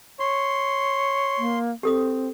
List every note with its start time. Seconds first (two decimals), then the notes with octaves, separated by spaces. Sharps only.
0.20 C#5 C6
1.38 A#3
1.83 C4 G4 A4 D#6